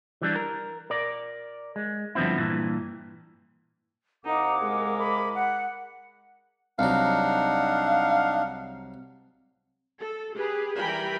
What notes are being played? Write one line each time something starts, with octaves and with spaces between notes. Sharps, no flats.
E3 G3 D4
A#4
A#4 D5
G#3
G2 D3 F3 B3 C4 E4
G2 A#2 E3
C2 D#4 F5 F#5 D6
G#3 A#4
B5
F#5
C2 F#3 D4 D#4 F5 F#5
A4
G4 G#4 B4
E3 G3 A#4 G5 G#5 B5